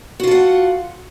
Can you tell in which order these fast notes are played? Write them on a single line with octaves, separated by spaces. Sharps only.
F#4 F4 A4 F#5